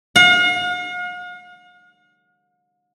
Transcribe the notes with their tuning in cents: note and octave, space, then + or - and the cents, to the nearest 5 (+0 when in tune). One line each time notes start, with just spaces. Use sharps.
F5 +45